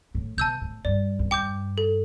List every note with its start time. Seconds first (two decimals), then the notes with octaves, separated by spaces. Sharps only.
0.15 A2
0.37 B2 A5 E6 G6
0.61 A2
0.85 G2 D5
1.19 E2
1.31 G2 G5 D6 G6
1.78 A4